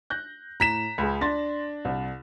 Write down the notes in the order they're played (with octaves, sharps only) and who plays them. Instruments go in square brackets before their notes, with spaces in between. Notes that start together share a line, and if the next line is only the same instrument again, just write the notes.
[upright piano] F#6 G6 A#6
[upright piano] A2 [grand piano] A#5 B6 E7
[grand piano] C#2 [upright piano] G#4 B5
[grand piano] D4 [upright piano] C6 A6 A#6
[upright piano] C2